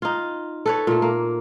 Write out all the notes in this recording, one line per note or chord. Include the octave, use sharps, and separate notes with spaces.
D#4 F4
A4 B4 C#5
A#2 A3
A#3